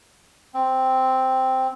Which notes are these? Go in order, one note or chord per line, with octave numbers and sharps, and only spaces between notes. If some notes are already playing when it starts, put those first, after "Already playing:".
C4